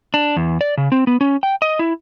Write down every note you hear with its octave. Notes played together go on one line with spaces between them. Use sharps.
D4
E2
D5
C#3
C4
B3
C#4
G5
D#5
E4